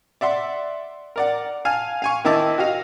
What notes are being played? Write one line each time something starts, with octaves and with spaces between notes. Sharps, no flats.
D5 E5 F#5 C6
A#4 D5 F#5
F5 G#5 A5 F6
F5 G#5 C#6
D#3 C4 D#4 E4 A5 D6
F#4 G4 D#5 F5